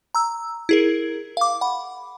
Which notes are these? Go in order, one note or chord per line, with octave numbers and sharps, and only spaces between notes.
A#5 E6
E4 G#4 A#4
F5 D6
F#5 B5